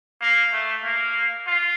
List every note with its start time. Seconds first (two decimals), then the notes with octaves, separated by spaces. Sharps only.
0.21 A#3
0.52 A3
0.84 A#3
1.47 F4